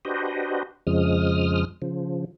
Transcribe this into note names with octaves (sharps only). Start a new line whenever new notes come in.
D4 F#4 G4 B4 C5 D#5
F2 C#3 F3 G#3 D#6 F6
C#3 F3